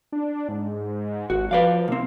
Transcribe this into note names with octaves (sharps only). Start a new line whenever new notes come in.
D4
G#2
G#1 F#4
F3 B4 D5 F5
C2 A#3 C4